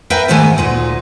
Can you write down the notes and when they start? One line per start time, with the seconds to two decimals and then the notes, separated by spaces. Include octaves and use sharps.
0.10 A#4 B4 E5 F5 G5 A5
0.28 D2 G#2 D#3 A3 G#5
0.58 D2 A#2 D#4